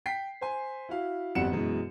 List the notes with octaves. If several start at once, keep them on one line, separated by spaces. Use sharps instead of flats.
G5 B6 C7
C5 G#5
E4 F#4 F5
G1 F2 G3 F#5 C#7 E7
F#2 B2 E3 G#3